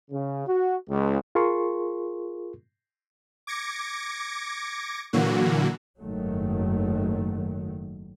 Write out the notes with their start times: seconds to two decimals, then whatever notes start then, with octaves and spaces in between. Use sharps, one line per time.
0.11 C#3
0.48 F#4
0.89 C#2
1.35 F4 G#4 A#4 C6 C#6
3.47 D6 G#6 A#6 C#7
5.13 A#2 D3 E3 F#3 A#3 F#4
6.00 F#1 G#2 D#3 F#3 A3